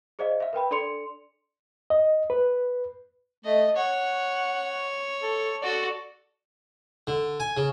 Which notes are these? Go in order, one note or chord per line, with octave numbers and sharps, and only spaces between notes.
G#4 C5 D5 D#5 F5
E5 F5
A#4 B4 G5 B5
D4 A4 D5 C6 C#7 F7
D#5
B4
A3 D#5
C#5 F#5
A4
F#4 A4 D5
D3
G#5
C#3